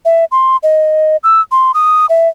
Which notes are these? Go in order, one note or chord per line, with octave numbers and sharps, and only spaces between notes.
E5
C6
D#5
E6
C6
D#6
E5